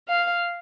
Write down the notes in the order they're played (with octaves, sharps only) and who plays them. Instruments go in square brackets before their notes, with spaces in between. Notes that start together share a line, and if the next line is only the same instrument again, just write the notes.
[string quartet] F5